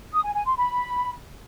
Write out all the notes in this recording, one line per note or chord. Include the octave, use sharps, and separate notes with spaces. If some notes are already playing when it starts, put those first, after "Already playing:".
D#6
G#5
G#5
C6
B5